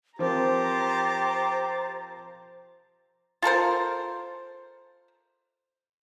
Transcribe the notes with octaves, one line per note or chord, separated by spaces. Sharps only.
F3 C4 G4 A#4 C5 A#5 A6
F4 A4 A#4 C5